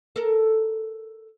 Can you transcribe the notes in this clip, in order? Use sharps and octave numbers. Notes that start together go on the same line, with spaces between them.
A4 A#4